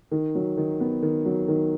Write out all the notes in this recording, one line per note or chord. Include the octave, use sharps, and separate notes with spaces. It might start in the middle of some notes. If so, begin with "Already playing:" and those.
D#3
F#3
D#3
B3
D#3
F#3
D#3